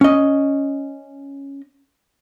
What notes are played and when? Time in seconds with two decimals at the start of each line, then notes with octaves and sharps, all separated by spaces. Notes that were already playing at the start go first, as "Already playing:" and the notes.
0.01 C#4 D#5